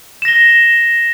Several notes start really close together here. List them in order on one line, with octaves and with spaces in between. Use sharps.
E7 A#6 G7